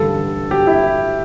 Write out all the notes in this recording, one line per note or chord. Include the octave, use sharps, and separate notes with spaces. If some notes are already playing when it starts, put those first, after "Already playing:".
Already playing: A1 G2 D3 A4
G4
E4